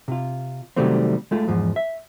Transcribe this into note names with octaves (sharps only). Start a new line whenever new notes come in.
C3 F4
C3 D#3 F#3 G3 A3 C4
G#3 A3 F4
E2 G#2 F3
E5